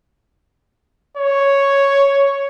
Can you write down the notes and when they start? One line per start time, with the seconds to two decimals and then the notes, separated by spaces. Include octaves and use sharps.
1.17 C#5